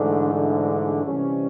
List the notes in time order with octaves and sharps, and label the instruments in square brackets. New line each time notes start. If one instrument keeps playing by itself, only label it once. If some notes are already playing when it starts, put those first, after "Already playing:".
Already playing: [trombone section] G#2 D3 E3 A3 D4
D3 D4
C3 E3 G3 C#4